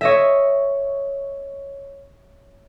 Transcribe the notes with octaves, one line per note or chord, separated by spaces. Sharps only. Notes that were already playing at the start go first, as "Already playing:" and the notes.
C#5 D#5 E5